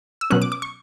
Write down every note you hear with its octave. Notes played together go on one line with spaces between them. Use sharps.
E6
B2 F#3 C#4 F#6
D6
D6
C#6